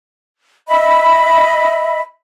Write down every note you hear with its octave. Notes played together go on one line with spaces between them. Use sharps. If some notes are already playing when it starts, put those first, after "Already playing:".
D#5 E5 B5